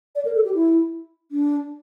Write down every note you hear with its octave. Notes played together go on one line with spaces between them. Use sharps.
D5
A#4
A4
G4
E4
D4